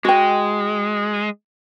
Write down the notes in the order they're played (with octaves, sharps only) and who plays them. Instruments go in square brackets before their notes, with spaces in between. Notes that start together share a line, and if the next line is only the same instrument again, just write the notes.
[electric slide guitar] G#3 [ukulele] F#4 G5